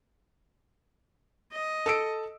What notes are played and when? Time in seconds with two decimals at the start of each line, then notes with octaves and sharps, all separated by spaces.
1.52 D#5
1.86 A4 E6 D7